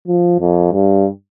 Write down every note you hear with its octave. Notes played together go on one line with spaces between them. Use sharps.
F3
F2
G2